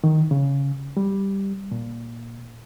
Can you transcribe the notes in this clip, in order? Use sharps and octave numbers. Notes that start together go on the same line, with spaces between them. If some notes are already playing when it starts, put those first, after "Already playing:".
D#3
C#3
G3
A#2